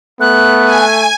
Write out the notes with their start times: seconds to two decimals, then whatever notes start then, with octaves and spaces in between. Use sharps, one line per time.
0.21 A3 B3 F#6
0.65 G#5